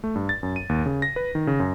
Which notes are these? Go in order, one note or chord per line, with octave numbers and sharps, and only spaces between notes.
A3
G2
A6
F#2
D#7
D#2
C#3
A#6
B4
D#3
C#3
F#2